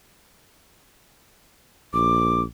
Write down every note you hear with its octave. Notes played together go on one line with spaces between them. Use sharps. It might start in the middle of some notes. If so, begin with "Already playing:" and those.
A#1 D6